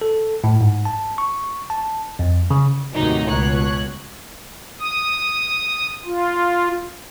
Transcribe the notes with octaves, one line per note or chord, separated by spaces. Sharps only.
A4
A2
G#2
A5
C#6
A5
F2
C#3
D#2 A2 C3 F#3 D#4
C#2 B2 C#5 F#6
D#6
F4